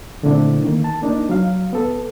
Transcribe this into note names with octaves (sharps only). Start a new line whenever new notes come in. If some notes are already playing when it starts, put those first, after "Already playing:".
A#2 D3 A3 C4 D4 E4
D#3 A#3
A5
A#3 D4 D#4
F#3 F5
B3 A4